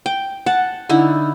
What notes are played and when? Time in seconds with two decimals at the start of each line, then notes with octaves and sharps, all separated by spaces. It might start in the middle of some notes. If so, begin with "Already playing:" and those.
0.06 G5
0.46 F#5 A5
0.89 D3 D#4 E4